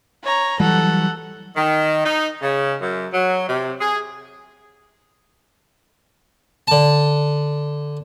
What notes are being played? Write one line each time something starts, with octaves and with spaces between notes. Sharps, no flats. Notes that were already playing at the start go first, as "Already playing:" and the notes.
C#5 A#5
E3 F#3 G3 A4 F#5
D#3
D#4
C#3
F#2
F#3
C3
G#4
D3 A5